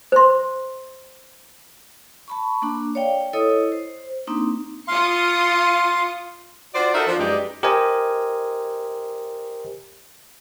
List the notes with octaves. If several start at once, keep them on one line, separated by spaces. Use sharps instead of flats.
C5 C6
A5 B5 C#6
A#3 D4
C#5 D5 F5 G5
E4 A4 C#5 D#5 D#6
C5
A#3 C4 D4 D#4
F4 F5 C6 D#6 C#7
F4 F#4 C5 D5
D#4 F#4 A4 A#4 C5 E5
F3 D4
F#2 G#3 D#4 G4 B4 D5
G4 A#4 C5 D#5 G#5